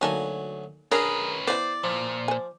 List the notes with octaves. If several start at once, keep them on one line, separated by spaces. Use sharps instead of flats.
D2 F#3 A#3 D#4 A4 G#5
C#4 D4 G#4 A#4 B4 C#5 F5 D#6
E3 B3 C5 D5
A#2 F3
C5 G#5